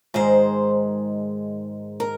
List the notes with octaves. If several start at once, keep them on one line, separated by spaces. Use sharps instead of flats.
G#2 D#3 G#3 C5
A#4